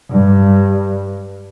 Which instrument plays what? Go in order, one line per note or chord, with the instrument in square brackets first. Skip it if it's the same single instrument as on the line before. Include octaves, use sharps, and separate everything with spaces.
[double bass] G2